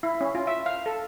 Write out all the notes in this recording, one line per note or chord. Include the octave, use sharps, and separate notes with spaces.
E4
C#4
F4
E5
F5
A4